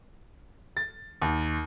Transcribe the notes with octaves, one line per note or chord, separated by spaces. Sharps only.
A6
D#2